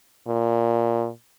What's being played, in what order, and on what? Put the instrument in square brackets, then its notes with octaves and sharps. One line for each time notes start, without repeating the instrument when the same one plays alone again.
[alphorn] A#2